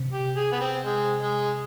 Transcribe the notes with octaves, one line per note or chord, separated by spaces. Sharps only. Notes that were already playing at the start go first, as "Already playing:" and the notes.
Already playing: C3
G4
G#4
B3
C4
G#3
G#3